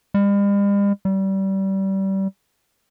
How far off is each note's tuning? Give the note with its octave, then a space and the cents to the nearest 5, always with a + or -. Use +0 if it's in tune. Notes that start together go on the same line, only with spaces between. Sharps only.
G3 +45
G3 -25